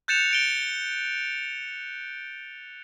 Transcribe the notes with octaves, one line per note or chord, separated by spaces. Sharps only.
F#6 G6 A6 C#7 E7 F7
A6 D7 G7